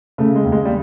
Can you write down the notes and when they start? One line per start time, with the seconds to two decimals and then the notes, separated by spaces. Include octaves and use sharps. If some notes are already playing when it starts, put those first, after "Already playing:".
0.18 C#3 A3
0.36 G#3
0.44 D#2
0.52 G#3
0.65 G3